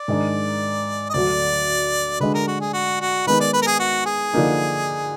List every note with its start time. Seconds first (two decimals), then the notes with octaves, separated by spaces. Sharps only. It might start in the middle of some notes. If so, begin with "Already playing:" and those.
Already playing: D5
0.08 G#2 D#3 G#3 D4
1.10 D#5
1.14 D2 D3 F#3 D5
2.20 D3 G#3 D4 B4
2.34 A#4
2.48 F#4
2.61 G#4
2.74 F#4
3.01 F#4
3.27 D#3 G#3 B3 D#4 B4
3.41 D5
3.54 B4
3.62 A#4
3.67 G#4
3.79 F#4
4.06 G#4
4.33 D3 F3 A#3 D#4